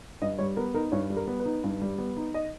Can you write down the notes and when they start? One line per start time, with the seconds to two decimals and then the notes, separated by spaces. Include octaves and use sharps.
0.22 G2 D#5
0.39 G3 C#5
0.56 B3 A#4
0.74 D#4 A#4
0.92 G2 C#5
1.10 G3
1.16 A#4
1.27 B3
1.40 B4
1.45 D#4
1.64 G2
1.81 G3
1.98 B3
2.17 D#4
2.34 D#5